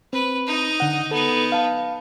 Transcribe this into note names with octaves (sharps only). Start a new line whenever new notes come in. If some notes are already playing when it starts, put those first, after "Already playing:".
C4 B4
D#4 D#5
D3 F#5
B3 D#4 A4
F5 A5